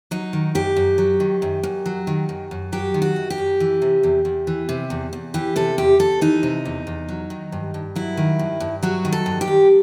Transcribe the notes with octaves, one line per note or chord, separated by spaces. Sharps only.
F#3 D#4
D#3
F#2 G4
F#2
F#3
D#3
F#2
F#2
F#3
D#3
F#2
F#2
F#3 G4
D#3
F#4
F#2
G4
F#2
E3
C3
E2
E2
E3
C3
E2
E2
E3 G4
C3 A4
E2 G4
E2 A4
E3 D#4
C3
E2
E2
F#3
D#3
G2
G2
F#3 E4
D#3
G2
G2
F#3 F#4
D#3
A4
G2
G4
G2